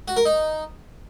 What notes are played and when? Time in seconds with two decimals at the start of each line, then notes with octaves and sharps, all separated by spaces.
0.08 F#4
0.17 A#4
0.25 D#4